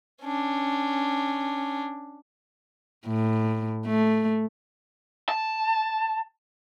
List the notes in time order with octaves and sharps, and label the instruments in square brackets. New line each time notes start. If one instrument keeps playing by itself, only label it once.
[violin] C#4 D4
[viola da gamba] A2
A3
[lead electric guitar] A5